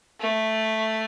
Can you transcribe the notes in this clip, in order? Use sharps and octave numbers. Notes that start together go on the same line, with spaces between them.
A3